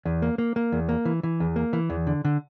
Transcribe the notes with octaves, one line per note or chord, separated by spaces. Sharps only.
E2
A#3
A#3
A#3
E2
A#3
E3
E3
E2
A#3
E3
E2
D3
D3